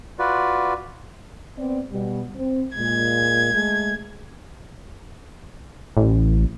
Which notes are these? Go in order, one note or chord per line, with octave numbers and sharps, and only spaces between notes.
F4 F#4 B4 D5
B3 C4 D5
B2 G3
C4
A#2 G#3 G#6
G#3 A3
A1